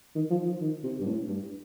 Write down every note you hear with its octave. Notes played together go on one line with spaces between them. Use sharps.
D#3
F3
F3
D#3
C3
G2
A2
G2